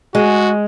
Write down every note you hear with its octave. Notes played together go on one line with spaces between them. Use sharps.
G#3 F#4